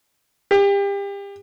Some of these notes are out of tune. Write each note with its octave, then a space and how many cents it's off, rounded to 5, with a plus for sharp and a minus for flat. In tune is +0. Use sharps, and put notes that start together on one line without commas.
G4 +30